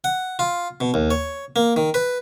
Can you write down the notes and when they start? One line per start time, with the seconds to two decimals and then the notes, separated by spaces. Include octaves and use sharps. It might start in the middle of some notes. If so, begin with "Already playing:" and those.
0.04 F#5
0.39 F4
0.81 B2
0.94 D#2
1.11 C#5
1.56 A#3
1.76 D#3
1.94 B4